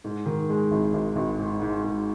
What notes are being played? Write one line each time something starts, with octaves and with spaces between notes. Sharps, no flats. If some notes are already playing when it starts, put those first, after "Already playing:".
G#2
D#3
G#3
G#1
G#1
G#1
G#2
G#2
G#2